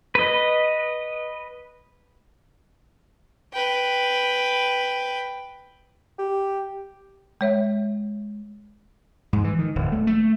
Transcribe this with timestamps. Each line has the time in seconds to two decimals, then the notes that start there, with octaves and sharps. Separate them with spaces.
0.15 B4 D#5
3.53 B4 G5
6.19 G4
7.41 G#3 C#5 E5
9.33 G#2
9.44 E3
9.59 D#3
9.75 D1
9.92 A3
10.07 A3